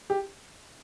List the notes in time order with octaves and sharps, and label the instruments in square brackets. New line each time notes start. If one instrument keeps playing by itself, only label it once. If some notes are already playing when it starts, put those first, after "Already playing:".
[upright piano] G4